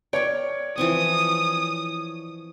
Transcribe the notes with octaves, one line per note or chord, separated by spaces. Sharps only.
A#4 C#5 D5 G5
E3 F3 C4 D#6